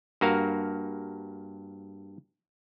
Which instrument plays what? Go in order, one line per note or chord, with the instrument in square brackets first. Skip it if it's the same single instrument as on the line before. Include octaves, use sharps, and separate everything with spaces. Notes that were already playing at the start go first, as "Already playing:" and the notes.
[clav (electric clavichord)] G2 A#3 F#4 A#4 F5